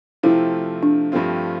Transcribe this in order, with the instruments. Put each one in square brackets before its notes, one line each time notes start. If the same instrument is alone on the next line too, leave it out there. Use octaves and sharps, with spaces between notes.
[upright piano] C3 F3 A3 C4 F4 [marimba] E4
[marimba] D4
[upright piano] G2 F3 A3 C4 F4